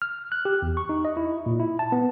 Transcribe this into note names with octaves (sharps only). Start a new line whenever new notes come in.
F6
F#6
G4
E2
C#6
D#4
D#5
E4
A#2
E4
A5
B3